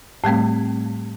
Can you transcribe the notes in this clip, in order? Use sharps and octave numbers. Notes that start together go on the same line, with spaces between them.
A2 G3 A3 C4